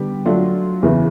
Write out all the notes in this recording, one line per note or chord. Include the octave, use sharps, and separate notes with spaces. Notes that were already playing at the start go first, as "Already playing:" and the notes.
Already playing: D3 G3 B3 G4
F#3 A3 D4 F4
E2 C#3 E3